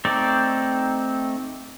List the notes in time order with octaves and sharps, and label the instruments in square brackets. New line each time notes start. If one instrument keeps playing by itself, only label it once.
[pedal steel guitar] A3 C4 D#4 D5